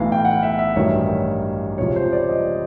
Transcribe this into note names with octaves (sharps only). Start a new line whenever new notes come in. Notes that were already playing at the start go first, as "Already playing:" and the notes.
Already playing: B1 A2 E3 F5
G5
F#5
E5
E5
A1 G2 D#3 F#3 C#5
C#2 C3 F3 C#5
C5
D5
D#5